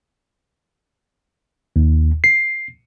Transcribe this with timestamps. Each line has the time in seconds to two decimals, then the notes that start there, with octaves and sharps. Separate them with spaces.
1.76 D#2
2.24 C7